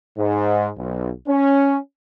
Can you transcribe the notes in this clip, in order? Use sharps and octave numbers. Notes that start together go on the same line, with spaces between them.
G#2
B1
C#4